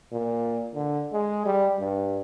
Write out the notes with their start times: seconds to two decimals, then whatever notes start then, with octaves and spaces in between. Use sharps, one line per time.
0.12 A#2
0.75 D3
1.13 G#3
1.46 G3
1.80 G2